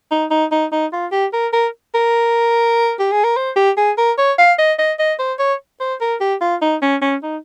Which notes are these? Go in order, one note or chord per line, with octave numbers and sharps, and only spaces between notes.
D#4
D#4
D#4
D#4
F4
G4
A#4
A#4
A#4
G4
G#4
A#4
C5
G4
G#4
A#4
C#5
F5
D#5
D#5
D#5
C5
C#5
C5
A#4
G4
F4
D#4
C#4
C#4
D#4